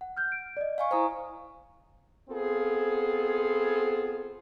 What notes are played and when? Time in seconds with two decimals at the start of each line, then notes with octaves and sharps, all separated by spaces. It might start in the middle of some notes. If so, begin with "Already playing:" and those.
0.01 F#5
0.17 F6 G6
0.32 D7
0.57 D5 D#5
0.78 F5 G#5 C#6
0.91 E4 C5 G#5 A#5 D#6
2.30 B3 C4 F4 G#4 A4